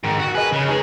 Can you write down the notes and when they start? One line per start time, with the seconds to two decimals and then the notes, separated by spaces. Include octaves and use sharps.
0.04 G#2 D#3 D7
0.19 F#4
0.35 G#4 A#4 B4 D#5
0.53 C#3
0.69 G#3 D#4 G#4 B4